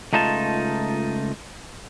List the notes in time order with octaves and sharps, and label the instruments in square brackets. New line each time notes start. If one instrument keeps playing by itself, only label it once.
[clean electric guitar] C#2 A3 D#4 F4 A5